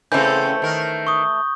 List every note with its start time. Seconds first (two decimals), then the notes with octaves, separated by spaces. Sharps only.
0.12 C#3 E3 A3 C4 C#4 G6
0.62 D#3 A#4
1.07 C#6 D#6